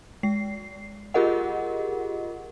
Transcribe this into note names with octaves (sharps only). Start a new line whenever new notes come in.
G#3 C7
F4 G4 G#4 A#4 D#5 F#5